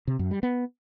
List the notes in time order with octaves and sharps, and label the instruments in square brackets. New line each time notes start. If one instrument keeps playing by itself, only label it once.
[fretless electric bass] C3
F#2
G3
B3